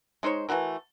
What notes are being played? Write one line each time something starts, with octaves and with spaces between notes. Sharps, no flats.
G#3 D#4 C5 C#5
E3 A3 F#4 A#4